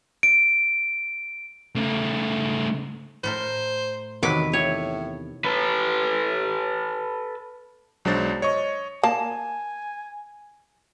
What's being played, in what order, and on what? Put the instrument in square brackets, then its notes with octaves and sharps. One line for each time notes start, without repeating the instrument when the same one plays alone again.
[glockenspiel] D7
[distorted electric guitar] C#3 A3
[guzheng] A2 A3 A#4 [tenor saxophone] C5
[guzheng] E2 C3 D#3 [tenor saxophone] F#3 [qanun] B4 D6
[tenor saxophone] A2 [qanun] C#5
[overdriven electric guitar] A4 B4
[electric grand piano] B1 F#3 G#3 D4 C5 A6
C#5 D#5 C#6
[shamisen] A#3 [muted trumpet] G#5 [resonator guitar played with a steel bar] A5